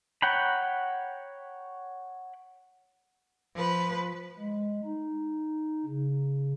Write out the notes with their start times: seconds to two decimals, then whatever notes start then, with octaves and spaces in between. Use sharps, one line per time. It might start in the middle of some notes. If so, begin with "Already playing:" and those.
0.22 C#5 F#5 G5 A#5 B5
3.55 F3 B4
4.39 G#3
4.85 D#4
5.86 C#3